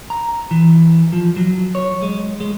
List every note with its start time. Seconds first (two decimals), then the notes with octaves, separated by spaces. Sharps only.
0.10 A#5
0.51 E3
1.13 F3
1.36 F#3
1.75 C#5
2.02 G#3
2.40 G#3